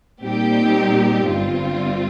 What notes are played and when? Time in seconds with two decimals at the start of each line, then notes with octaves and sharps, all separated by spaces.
0.21 A#2 G3 C4 D#4 G4
1.27 G1 G2 G3 C4 F4